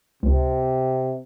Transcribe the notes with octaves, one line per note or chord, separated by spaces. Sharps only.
C#2 C3